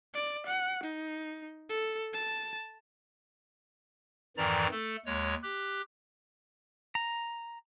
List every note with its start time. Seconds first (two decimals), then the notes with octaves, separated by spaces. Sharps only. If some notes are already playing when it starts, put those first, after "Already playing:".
0.14 D5
0.46 F#5
0.83 D#4
1.70 A4
2.14 A5
4.37 F2 G#2 D#3 E3 D5 A#5
4.71 A3 A4
5.06 D#2 G#3 C#5
5.42 G4 F#6
6.95 A#5